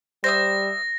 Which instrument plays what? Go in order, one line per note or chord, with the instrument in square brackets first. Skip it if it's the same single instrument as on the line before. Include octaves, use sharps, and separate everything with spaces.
[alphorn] G3 [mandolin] C5 E5 D#6 [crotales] A#6